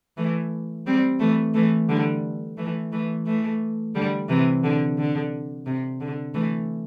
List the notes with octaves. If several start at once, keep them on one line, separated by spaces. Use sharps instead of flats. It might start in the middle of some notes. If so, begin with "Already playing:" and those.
E3 A3
G3 C4
E3 A3
E3 A3
D3 G3
E3 A3
E3 A3
E3 A3
D3 G3
C3 E3
D3
D3
C3
D3
E3 A3